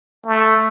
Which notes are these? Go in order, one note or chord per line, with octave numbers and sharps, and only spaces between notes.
A3